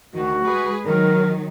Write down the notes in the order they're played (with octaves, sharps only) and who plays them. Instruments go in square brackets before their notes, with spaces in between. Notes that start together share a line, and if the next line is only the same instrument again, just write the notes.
[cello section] D2 D#3 [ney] F#4
[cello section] G#3 G#4 B4
[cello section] D#3 F#3 [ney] A#4